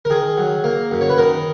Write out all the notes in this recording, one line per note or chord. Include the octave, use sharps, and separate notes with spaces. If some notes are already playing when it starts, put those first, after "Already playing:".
A#4
D#3 G#4
F#3
A#3
F#2
C#5
B4
D#3 A#4